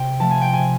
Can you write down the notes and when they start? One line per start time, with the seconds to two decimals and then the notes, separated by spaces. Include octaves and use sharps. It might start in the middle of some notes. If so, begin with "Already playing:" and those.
Already playing: C3 G5
0.20 F3 A3 A5
0.31 G#5
0.41 G5
0.53 C3 G#5